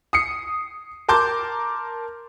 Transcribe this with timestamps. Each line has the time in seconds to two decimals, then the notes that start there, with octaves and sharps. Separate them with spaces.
0.13 D#6 C7 C#7
1.08 A#4 A5 C6 D6 G6